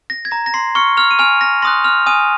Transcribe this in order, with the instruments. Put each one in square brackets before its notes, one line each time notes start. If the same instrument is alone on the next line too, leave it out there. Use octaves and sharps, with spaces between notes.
[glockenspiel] A#6
G#6
A#5 A#6
A#6
C6 C7
C#6 F6 C#7
F6 F7
D#7
G#5 F6 F7
A#6
C6 D#6 F#6 A#6
F6 F7
G#5 D#6 D#7